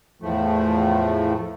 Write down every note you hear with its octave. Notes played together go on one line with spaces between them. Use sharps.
E2 A2 F3 A3